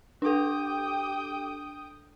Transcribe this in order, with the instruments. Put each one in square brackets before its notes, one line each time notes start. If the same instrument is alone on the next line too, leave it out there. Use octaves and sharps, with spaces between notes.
[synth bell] D4 A4 [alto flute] G4 [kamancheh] G5 D#6